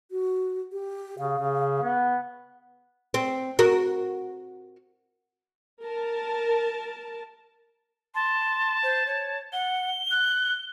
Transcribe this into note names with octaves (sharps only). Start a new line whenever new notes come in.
F#4
G4
C#3 F5
C#3
B3
C4
F#4 A#4
A#4 A5
A5 C6
C5
C#5
F#5 G7
F#6